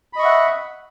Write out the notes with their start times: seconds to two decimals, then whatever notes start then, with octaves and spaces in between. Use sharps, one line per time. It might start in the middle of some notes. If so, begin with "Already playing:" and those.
0.13 B5
0.16 D#5
0.19 C#6
0.22 E5
0.25 F#5